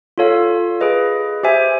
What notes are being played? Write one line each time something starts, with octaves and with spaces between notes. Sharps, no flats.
F4 A4 C#5 F5
G#4 B4 D#5
G4 C5 E5 G#5